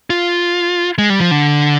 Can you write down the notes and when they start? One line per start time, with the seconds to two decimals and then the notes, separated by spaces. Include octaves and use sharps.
0.10 F4
0.98 G#3
1.10 G3
1.20 F3
1.31 D3